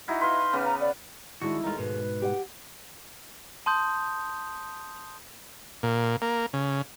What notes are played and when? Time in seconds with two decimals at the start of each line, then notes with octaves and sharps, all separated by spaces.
0.08 D#4 E4 F#4
0.21 B4 F5 C6
0.53 C#3 B3 D6
0.65 A#5
0.81 D5
1.42 D#3 G#3 D4 E4 F#4
1.64 D#2 G#3 A3 D#4 F4
1.78 G#2 B2 B4
2.22 G4 E5 F#5
3.66 A5 C6 D#6 G6
5.83 A#2
6.22 A#3
6.53 C#3